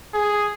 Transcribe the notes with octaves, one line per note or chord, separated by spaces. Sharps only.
G#4